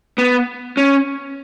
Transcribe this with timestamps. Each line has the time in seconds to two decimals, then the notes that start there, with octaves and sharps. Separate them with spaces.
0.18 B3
0.77 C#4